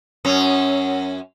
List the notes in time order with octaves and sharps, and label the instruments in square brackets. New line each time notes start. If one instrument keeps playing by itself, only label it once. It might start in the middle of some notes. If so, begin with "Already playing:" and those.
[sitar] F#2 C#4